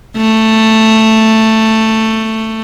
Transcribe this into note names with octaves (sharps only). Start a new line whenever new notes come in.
A3